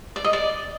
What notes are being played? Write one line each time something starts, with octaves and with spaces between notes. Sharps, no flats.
D5
D#5
D5